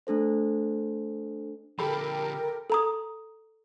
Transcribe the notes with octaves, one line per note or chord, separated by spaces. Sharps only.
A3 D4 A4 C5
D3 F3 G4 A4 A#4 G5 B5
A4 A#5 D#6